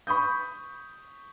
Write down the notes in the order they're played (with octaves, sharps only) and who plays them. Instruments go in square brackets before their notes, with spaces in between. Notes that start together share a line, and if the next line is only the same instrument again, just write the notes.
[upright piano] B5 C#6 D#6 G6